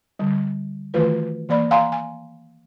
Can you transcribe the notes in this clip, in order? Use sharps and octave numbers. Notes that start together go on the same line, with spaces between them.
D3 G3
D#3 E3 A3 F4 F#4 B4
E3 A#3 D5 B5
F5 F#5 G#5 A#5 C6
G#5